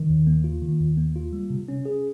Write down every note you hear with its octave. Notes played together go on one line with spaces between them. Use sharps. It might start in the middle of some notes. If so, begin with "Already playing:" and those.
Already playing: D#3
D#2
A#3
F4
D#3
D#2
A#3
F4
G3
C3
C#4
G#4